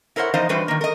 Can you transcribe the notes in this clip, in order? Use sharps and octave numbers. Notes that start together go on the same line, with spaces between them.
E4 A#4 C5 C#5 F#5
E2 F3 D#4 C5 D#5 F5
E3 G3 D4 F#4 B4 C5
D#3 A#3
A#4 D#5